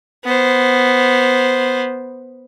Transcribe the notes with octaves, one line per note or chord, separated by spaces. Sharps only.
B3 C5